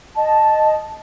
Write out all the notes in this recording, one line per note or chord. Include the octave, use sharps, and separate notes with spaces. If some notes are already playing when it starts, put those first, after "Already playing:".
D#5 A5